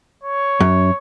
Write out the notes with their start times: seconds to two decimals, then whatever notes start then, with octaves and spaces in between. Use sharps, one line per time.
0.23 C#5
0.60 F#2